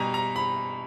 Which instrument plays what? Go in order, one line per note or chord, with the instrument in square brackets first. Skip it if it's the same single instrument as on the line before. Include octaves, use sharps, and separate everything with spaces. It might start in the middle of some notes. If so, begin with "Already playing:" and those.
Already playing: [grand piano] B2 G3 G#5 A#5
A#5
B5